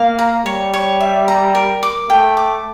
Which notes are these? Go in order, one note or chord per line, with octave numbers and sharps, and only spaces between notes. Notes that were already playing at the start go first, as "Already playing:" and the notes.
Already playing: A#3 F5
A#5
G3 C#5
C#5
E5
A#5
A#4
D6
A3 G5
D6